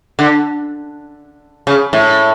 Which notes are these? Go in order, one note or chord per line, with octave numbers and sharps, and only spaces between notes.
D3
C#3
A2